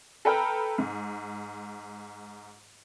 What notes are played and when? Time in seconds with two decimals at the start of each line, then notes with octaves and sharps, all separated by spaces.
0.25 A4 B4 G5 A#5 F6
0.78 G#2